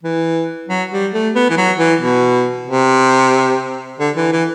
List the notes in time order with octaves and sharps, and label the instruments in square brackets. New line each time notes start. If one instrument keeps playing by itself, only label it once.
[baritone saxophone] E3
F#3
G3
A3
B3
E3
F#3
E3
B2
C3
D3
E3
E3